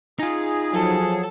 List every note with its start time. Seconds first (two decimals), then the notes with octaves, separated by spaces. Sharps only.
0.19 D#4 F4 G#4
0.73 F3 F#3 A4